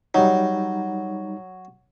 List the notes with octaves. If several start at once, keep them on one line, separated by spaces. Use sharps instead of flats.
F#3 G3 D#4